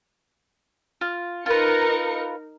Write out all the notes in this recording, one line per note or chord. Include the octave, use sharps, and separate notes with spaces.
F4
D#4 F4 A#4 B4 C#7